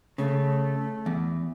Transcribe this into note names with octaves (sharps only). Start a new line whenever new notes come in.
C#3 A3
E2